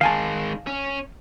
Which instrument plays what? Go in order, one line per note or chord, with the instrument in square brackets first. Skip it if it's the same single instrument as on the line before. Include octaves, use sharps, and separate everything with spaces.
[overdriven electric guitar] D#3 G#3 [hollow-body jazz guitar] F5 G#5 A5
[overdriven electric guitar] C#4